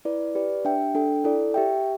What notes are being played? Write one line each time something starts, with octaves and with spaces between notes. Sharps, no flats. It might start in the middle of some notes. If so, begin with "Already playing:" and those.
E4 B4 D5
G4 B4 D5
D4 G4 E5 G5
D4 A4 G5
E4 A4 D5
G4 E5 G5